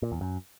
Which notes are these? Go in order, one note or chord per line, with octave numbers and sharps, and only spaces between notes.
A#2
E2
F#2